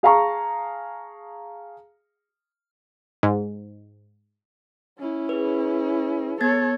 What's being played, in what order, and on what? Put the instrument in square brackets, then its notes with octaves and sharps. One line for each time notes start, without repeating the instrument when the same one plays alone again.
[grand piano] G#4 F5 A5 A#5 C#6
[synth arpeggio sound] G#2
[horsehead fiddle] C#4 E4
[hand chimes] G#4 B4
[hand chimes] B3 G#6 A6 [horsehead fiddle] A4 C#5